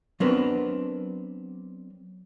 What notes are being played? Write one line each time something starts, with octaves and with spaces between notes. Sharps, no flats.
F#3 B3 C4 D4 A#4 B4